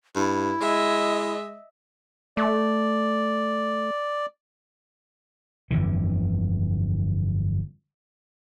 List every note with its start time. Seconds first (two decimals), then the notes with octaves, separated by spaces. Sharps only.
0.16 G2 E4
0.61 G#3 D#5 E5
2.37 A3 D5
5.71 G1 F2 D3 E3